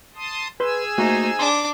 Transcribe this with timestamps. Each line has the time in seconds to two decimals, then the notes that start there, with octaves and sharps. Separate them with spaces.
0.16 A5 C6 D#6
0.60 G#4 B4 G#5 C6 E6
0.98 A3 A#3 D#4 F#4 C5
1.39 D4 C6 D6